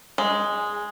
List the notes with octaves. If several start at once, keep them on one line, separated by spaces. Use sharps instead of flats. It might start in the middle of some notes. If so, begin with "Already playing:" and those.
G#3